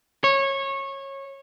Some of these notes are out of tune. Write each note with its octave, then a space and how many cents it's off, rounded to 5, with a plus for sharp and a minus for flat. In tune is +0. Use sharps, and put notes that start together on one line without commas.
C#5 -20